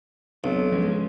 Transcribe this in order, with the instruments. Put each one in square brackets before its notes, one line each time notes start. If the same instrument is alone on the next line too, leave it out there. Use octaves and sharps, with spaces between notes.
[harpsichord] B1 [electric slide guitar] C4 D4 F#4
[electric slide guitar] F3 G#3 C#4